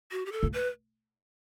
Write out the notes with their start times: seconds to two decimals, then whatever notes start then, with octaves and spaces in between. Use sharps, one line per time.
0.12 F#4
0.26 G4
0.32 A4
0.43 A3
0.54 B4